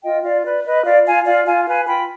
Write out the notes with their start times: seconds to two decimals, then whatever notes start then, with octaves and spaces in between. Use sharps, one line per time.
0.03 F4 D#5 G5
0.24 F4 D5 F5
0.44 B4 D5
0.65 B4 D#5
0.85 F4 D5 F5
1.05 F4 F5 G#5
1.25 F4 D5 F5
1.46 F4 F5 G#5
1.67 B4 F5 G#5
1.87 F4 G5 B5